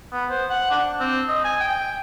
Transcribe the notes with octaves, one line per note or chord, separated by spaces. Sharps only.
B3
C5
F#5
D4
C4
D#5
G#5
G5